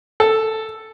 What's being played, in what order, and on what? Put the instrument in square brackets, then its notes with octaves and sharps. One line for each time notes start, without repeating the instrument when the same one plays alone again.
[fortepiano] A4